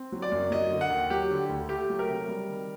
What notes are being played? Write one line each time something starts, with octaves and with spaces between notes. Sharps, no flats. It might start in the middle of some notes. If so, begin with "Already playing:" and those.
Already playing: C4
F#3
D5
F#2
F#3 D#5
D3
F#5
D#2
F#3 G4
D3
D2
A3 G4
F#3
A#4
C3
G3
D#3